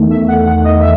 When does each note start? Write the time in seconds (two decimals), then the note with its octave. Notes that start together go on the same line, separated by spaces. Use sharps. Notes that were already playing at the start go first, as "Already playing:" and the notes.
Already playing: E2 D#3 A3
0.10 E5
0.28 F#5
0.46 F#5
0.64 D#5
0.81 E5